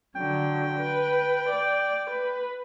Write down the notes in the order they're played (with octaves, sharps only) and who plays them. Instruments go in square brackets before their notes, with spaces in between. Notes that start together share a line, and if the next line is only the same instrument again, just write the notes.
[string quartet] D3 F#3 [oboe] G5
[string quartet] B4
D5
B4